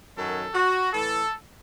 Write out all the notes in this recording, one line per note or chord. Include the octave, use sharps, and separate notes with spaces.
F#2 D#3 F#3 A4
F#4
A2 E3 A4